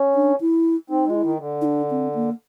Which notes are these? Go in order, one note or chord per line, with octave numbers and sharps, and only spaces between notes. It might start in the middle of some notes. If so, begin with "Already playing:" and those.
Already playing: C#4
D4
E4
C4 D#4
G#3 F4
E4
D#3
D3
D#4
D4
C4
A#3